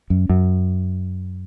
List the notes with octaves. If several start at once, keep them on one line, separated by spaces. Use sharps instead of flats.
F#2
F#2